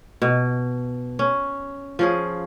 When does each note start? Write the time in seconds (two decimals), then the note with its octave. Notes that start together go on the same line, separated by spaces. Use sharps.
0.22 B2
1.19 C#4
1.99 F3 C#4 G#4